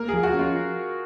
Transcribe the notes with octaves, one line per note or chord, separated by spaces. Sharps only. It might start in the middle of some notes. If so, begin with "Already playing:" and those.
Already playing: A#3 A#4
F3 G#4
F#4
C#4 F4